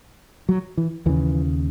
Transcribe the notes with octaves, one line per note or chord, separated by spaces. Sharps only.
F#3
E3
D#2 C#3 E3